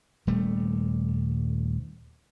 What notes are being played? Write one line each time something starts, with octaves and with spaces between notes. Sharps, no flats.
D#1 G3 A3